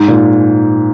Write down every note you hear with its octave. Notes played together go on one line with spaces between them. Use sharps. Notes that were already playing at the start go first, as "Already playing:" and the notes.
Already playing: G#2
A#2